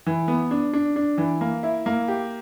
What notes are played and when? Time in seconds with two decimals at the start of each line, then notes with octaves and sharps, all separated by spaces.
0.06 E3
0.28 B3
0.51 D4
0.73 D4
0.96 D4
1.18 E3
1.41 A#3
1.63 E4
1.86 A#3
2.08 G4